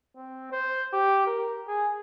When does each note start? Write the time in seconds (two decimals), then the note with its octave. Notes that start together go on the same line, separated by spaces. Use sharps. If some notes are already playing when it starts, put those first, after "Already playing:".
0.16 C4
0.52 C5
0.93 G4
1.27 A#4
1.67 G#4